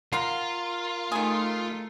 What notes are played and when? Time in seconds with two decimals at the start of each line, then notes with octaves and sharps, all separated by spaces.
0.12 F4 A#4 F5 F#5 A#5
1.12 D#3 A3 G#4